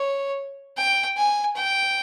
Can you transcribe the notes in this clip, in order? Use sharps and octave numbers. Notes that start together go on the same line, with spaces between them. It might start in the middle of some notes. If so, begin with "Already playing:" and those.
Already playing: C#5
G5
G#5
G5